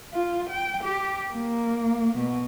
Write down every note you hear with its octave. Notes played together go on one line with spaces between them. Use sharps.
F4
G5
G4
A#3
B2